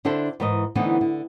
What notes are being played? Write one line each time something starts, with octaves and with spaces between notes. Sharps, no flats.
D3 D4 E4 A4 C5
G#2 E3 A#4 D#5
D3 E3 A3 B3 C4 D#4
D3